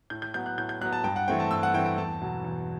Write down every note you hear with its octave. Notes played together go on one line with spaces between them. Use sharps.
A2 G6
G6
F#3 B3 G6
F#6
A2 G6
G6
F#3 B3 F#6
A5
G2 G5
F#5
E3 A3 C4 G5
A5
G2 E6
F#5
E3 A3 C4 G5
G5
E2 A5
B2 F#3
E2